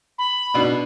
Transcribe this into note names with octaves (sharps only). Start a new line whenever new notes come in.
B5
B2 D4